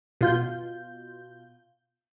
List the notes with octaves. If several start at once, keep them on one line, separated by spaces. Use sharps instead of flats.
B2 F4 G6